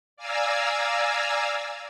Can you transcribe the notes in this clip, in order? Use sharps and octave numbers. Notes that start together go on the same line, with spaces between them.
D5 F5 G#5 A#5 E6